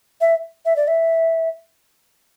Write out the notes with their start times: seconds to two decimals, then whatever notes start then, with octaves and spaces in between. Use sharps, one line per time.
0.21 E5
0.66 E5
0.76 D5
0.88 E5